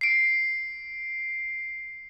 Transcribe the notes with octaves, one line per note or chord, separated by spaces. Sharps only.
C7 D7